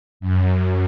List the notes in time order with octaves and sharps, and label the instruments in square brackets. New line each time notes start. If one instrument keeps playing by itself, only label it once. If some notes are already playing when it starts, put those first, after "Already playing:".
[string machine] F#2